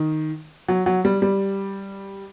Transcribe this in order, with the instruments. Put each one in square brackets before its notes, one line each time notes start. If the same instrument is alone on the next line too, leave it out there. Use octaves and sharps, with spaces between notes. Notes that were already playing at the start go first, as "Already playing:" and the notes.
Already playing: [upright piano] D#3
F#3
F#3
G3
G3